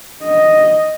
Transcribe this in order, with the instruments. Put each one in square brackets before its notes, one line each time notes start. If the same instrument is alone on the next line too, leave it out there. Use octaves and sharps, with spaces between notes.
[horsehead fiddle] D#5